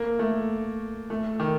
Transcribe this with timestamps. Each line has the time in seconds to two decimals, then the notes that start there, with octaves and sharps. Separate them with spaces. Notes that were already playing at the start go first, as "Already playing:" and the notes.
Already playing: A#3
0.19 A3
1.10 A3
1.40 D#3